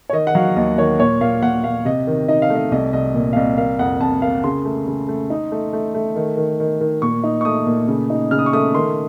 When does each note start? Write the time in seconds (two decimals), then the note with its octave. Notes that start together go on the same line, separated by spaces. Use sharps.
0.10 C#5
0.13 D#3 D#5
0.27 F#5
0.35 F#3 F5
0.56 D#2 D#5
0.78 D#3 C#5
1.00 A#2 C#5
1.21 A#2 F5
1.43 A#2 F#5
1.64 A#2 F5
1.85 C3 D#5
2.07 D#3
2.28 D#4 D#5
2.42 F5
2.50 A3
2.55 D#5
2.72 C2 D#5
2.93 C2 D#5
3.14 A#2
3.33 F5
3.36 C2 D#5
3.58 A#3 F5
3.79 F2 F#5
4.00 F2 A5
4.22 A#3 F5
4.44 C#3 C6
4.65 A3
4.87 C#3
5.08 A3
5.30 D#4
5.52 A3
5.73 A3
5.94 A3
6.16 D#3
6.37 D#3
6.60 D#3
6.81 D#3
7.02 A#2 C#6
7.24 D#4
7.41 C#6
7.45 A3 D#6
7.66 A#2
7.88 C#3
8.10 D#4
8.31 C#3 F6
8.39 D#6
8.46 C#6
8.53 A3 D#6
8.74 D#3 C6